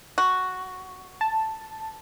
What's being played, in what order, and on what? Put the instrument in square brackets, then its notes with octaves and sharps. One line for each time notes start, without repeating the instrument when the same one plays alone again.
[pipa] F#4
[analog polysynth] A5